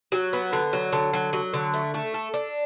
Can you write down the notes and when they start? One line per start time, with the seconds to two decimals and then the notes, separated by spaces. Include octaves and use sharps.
0.12 F#3
0.33 B3
0.53 D3
0.73 F#3
0.93 D3
1.13 F#3
1.33 F#3
1.53 D3
1.74 A3
1.94 A3
2.14 A4
2.34 D4